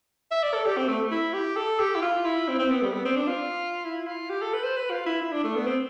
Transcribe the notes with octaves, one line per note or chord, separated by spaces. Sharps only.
E5
D5
A4
G4
C4
A3
E4
G4
A4
G4
E4
F4
E4
C4
C4
B3
G3
B3
C4
D4
F4
E4
F4
G4
A4
B4
C5
B4
F4
E4
E4
D4
A3
B3
C4